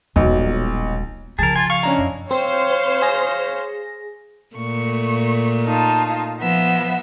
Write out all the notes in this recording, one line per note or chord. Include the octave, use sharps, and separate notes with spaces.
D#1 B1 F#3 G#3
C#3 F3 G#4 A#4 A5
F4 G#5
F5 C#6
C#4 D4 E4 D#5 A#5
F#2
C4 C5 C#5 F5
G#4 A#6
A#2 A3 C#6
D#4 F4 A5
F3 B3 E5